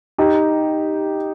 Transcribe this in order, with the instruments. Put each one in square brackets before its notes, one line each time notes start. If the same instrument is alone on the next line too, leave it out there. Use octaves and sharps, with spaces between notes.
[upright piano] D#4 G4